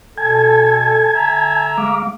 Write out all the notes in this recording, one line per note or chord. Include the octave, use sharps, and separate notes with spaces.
B2 A4 G#5 A5 G#6
D3 E5 A#5
G#3 F5 D6